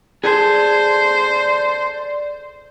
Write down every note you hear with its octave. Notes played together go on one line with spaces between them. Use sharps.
G#4 A4 C5 D5